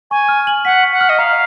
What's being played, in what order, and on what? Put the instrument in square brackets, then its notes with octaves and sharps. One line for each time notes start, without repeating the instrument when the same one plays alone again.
[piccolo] G#5 [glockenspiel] C#6
[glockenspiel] F6
F#7
[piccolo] F#5 [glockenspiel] B6
[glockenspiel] C#6
[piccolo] F#5
[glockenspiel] F6
[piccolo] D#5
[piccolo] F5 [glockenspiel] A#5